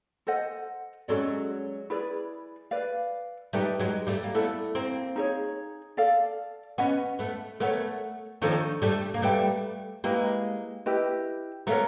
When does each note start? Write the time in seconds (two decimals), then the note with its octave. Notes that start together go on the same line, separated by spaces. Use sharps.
0.27 A4 C5 D#5 F#5
1.08 F#3 G#3 C#4 F4 A4 D5
1.90 E4 G#4 B4 D5
2.71 B4 D5 F5
3.53 G3 A3 D#4 G4 B4 E5
3.79 F#3 G#3
4.07 G3 A3
4.23 A#3
4.34 A3 B3 E4 A4 D5
4.75 A#3 C4
5.16 D#4 G#4 C#5
5.97 A4 D5 F5
6.78 B3 C#4 B4 D#5 F#5
7.19 A3 B3
7.60 A3 B3 A#4 C#5 F#5
8.42 D#3 F3 D4 F#4 A4 C#5
8.82 G3 A3
9.14 A#3
9.22 G3 A3 B4 E5 G5
10.04 G#3 A#3 E4 G4 B4
10.86 E4 G4 B4 D#5
11.67 A3 B3 A#4 C#5 F5 A#5